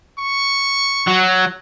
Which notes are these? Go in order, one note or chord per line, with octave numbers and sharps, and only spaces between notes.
C#6
F#3